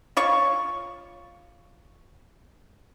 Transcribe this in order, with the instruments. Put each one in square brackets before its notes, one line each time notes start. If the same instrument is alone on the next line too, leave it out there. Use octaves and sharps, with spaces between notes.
[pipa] F4 C#5 C#6